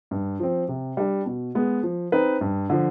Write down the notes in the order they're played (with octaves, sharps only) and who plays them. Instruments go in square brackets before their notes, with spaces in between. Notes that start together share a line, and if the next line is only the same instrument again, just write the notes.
[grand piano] G2
F3 C4
C3
G3 D4
B2
G#3 B3
F3
C4 D#4 B4
G2
D3 F3